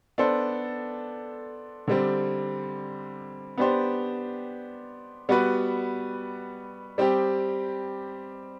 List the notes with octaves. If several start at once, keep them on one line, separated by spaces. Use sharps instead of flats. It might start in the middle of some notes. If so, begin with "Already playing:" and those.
B3 D4 A4 C5
D3 G3 C4
B3 D4 G4 C5
G3 B3 F#4 B4
G3 C4 G4